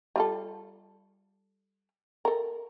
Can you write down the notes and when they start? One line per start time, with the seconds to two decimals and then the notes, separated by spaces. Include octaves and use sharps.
0.16 G3 F4 A4
2.25 A4 A#4